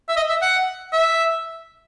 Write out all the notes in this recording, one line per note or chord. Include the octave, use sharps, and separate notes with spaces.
E5
D#5
E5
F#5
E5